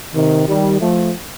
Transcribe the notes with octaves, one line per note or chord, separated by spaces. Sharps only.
C3 D#3
D#3 G3
F3 A3